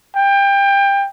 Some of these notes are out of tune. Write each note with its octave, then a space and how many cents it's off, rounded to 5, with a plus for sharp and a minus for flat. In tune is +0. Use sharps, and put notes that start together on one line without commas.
G5 +25